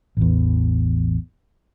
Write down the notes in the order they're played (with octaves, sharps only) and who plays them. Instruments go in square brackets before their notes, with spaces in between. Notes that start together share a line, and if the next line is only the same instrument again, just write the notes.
[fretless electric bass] A1 E2